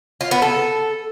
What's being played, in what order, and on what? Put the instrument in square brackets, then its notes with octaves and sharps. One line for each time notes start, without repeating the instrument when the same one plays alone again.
[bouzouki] F4
B3
A4